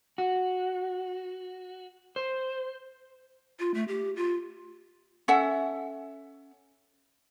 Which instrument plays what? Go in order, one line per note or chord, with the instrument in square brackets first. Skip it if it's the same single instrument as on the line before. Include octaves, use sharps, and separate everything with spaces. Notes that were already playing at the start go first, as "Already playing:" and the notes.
[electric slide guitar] F#4
C5
[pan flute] F4
A3
G4
F4
[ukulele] C#4 A4 E5 F#5